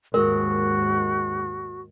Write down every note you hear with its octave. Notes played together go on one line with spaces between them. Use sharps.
D#2 G#2 G#3 F#4 A#4